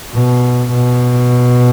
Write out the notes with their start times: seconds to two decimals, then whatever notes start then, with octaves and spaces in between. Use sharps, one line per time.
0.14 B2
0.73 B2